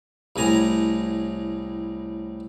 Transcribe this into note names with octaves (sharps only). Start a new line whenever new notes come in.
C2 A2 G#5 A#5